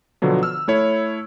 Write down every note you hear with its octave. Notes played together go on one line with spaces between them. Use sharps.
B2 D3 F3 F#3 B3
E6 F6
A3 E4 C#5